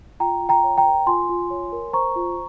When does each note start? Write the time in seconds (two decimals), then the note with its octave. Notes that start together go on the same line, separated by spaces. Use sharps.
0.20 F4 G5 A#5
0.42 F4
0.49 G5 A#5
0.64 C#5
0.77 G5 A#5
0.86 A#4
1.06 F4 G#5 C6
1.29 F4
1.50 C#5
1.73 A#4
1.93 C5 A#5 C#6
2.16 F4